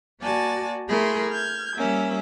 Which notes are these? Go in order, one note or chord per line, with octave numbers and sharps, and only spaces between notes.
A#3 F#4 D5 G#5 A5 A6
A3 E4 G#4 A#4 B5 C6
F6 G6 G#6
G3 A#3 C#4 E5